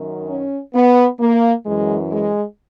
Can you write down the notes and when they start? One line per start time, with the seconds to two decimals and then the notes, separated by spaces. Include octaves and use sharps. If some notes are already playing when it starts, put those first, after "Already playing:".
Already playing: F#2 D#3
0.29 C#4
0.75 B3
1.20 A#3
1.66 F#2 E3 G#3
2.12 G#3